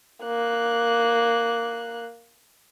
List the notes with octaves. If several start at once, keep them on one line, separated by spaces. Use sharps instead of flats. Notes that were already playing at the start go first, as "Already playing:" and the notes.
A#3 F#6